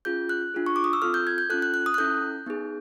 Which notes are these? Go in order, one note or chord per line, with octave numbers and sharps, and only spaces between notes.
C#4 F4 G#4 G6
F#6
D4 F4 G#4
C#6
D6
D#6
E6
C4 F4 A4 F6
G6
G#6
G6
C#4 F4 A4 F#6
F#6
F#6
D#6
F#6
C#4 E4 A4 G6
B3 D#4 G#4